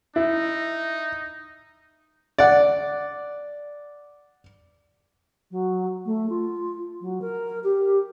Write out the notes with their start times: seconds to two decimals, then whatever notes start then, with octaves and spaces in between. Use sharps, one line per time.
0.16 D#4 E4
2.38 D5 F#5
5.51 F#3
6.05 A3
6.29 F4
7.01 F#3
7.21 A#4
7.63 G4